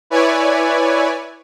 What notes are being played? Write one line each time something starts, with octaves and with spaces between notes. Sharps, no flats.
E4 B4 C#5 D5 G#5